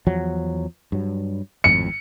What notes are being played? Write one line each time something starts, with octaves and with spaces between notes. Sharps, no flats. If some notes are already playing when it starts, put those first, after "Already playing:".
E2 F3 F#3
G2 F#3
G#1 F2 A2 C#7